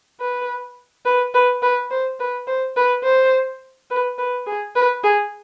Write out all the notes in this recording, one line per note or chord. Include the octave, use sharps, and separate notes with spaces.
B4
B4
B4
B4
C5
B4
C5
B4
C5
B4
B4
G#4
B4
G#4